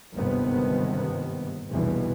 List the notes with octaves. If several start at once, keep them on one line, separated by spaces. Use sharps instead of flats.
G1 D#2 G#2 C3 D#3 B3
F1 B1 E2 G2 B2 E3